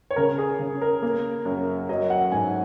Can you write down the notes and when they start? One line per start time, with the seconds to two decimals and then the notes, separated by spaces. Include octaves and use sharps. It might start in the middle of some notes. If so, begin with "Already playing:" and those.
0.11 C#5
0.16 C#3 A#4
0.38 G#4
0.59 C#3
0.82 A#4
1.02 A#3
1.45 F#2
1.89 F#3 D#5
2.10 F#5
2.32 G#2 G#5